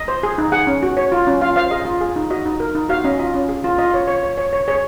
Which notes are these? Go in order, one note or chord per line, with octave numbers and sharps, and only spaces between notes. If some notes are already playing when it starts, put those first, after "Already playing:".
Already playing: D#5
C5
G#4
D#4
G#4 F#5
C#4
F#4
C#5
F4
C#4
F4 F5
C5 F5
G#4 D#5
F4
G#4
D#4
F#4 D#5
D#4
A#4
D#4
F#4 F5
C#4 D#5
F4 D#5
C#4
G#4
F4
F4 D#5
C#5
C#5
C#5
C#5
C#5
G#4 C#5